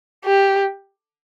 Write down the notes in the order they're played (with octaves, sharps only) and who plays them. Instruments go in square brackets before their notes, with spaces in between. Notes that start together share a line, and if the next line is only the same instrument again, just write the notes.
[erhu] G4